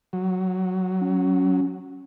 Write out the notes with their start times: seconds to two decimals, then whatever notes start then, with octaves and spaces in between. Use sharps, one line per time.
0.13 F#3
1.01 C#4